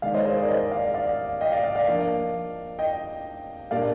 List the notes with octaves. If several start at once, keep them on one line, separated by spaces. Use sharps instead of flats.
D#3 G#3 D#4 D5 F5
C5 D#5
G#4 C5
A#4 D5
C5 D#5
D5 F5
D5 F5
D#5 G5
D5 F5
D5 F5
D5 F5
F3 A#3 D4
D#5 G5
A#2 G3 A#3 D4 D5 F5